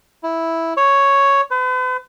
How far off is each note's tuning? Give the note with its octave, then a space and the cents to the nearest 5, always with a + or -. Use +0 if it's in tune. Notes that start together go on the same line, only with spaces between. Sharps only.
E4 -5
C#5 +0
B4 +45